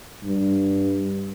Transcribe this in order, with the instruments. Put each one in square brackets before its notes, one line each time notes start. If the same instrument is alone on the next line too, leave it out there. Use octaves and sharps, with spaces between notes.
[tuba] G2